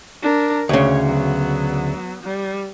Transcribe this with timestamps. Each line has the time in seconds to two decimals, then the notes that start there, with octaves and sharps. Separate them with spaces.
0.22 D4 A#4
0.69 D2 C#3 C#5
1.05 F#3 B3
2.23 G3